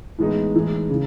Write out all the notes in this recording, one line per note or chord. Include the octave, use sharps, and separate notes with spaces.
A2 E3 G#3 B3 D#4
A2 E3 G#3 D#4
C#3